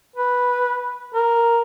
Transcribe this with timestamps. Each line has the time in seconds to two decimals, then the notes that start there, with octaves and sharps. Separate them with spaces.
0.16 B4
1.15 A#4